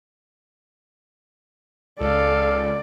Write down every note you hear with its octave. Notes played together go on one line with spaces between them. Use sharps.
C#2 A4 D5 F5